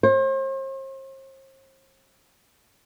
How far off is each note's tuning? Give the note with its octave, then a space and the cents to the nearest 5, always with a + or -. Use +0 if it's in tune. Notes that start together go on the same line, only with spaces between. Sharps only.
C5 +40